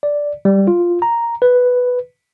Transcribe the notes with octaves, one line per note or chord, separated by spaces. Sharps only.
D5
G3
F4
A#5
B4